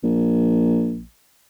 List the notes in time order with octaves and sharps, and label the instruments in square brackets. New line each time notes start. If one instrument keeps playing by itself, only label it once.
[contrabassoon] A#1